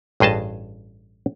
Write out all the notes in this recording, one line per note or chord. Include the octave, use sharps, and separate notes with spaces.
A1 G2 G#4 D#5 A5